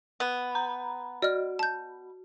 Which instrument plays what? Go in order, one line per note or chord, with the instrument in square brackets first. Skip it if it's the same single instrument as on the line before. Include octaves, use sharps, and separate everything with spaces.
[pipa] B3
[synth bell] A#5
[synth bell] F#4 [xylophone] D5 D#5 F6
[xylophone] A5 G6